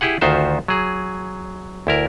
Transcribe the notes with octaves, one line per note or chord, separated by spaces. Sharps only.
E4 G4 G#4 F#5
D2 D#3 F4 F#4 C5 E5
F#3 G#4
D2 E4 A#4